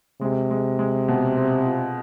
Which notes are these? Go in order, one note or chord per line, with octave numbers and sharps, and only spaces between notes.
C3 G#3
G#3
G#3
B2
C4
F4